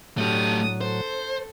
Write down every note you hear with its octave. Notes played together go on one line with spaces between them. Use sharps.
A2 F#3 A3 D4 G4 D#6
A4 C5